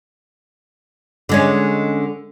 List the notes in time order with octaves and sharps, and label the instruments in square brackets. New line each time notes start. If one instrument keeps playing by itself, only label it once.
[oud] D3 G#3 C#4